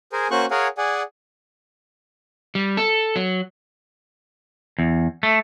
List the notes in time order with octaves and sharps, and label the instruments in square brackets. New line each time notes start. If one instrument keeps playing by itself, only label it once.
[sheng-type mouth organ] G#4 A#4 C5 G#5
A#3 C#4 F#4 C5 C#6 F#6
G#4 A#4 C#5 F5 F#5 G#5
G#4 D5 F#5 G#5
[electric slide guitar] G3
A4
F#3
[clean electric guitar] E2
A3